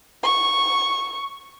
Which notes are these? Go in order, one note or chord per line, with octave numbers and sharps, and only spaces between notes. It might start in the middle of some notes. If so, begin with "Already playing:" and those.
C#6